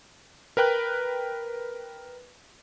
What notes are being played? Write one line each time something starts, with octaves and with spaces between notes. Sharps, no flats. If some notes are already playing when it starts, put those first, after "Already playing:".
A#4 B4 G5 F#6